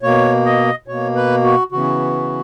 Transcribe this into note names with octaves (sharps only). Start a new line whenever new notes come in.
B2 A#3 C#5
D#5
B2 A#3 C#5
B4
F#4
C#3 E3 B3 F#4